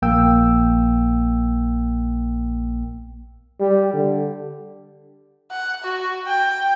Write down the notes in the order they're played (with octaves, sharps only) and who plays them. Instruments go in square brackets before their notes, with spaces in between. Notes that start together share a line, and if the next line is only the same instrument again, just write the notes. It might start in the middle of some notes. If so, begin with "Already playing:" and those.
[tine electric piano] A#1 A#3 G5 E6
[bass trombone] G3
D3
[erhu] F#5
F#4
G5